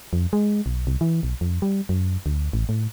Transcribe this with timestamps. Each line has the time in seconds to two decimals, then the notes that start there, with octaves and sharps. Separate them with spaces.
0.13 F2
0.33 G#3
0.66 B1
0.87 C2
1.01 E3
1.23 B1
1.41 F2
1.62 G3
1.89 F#2
2.26 D2
2.53 A1
2.69 A2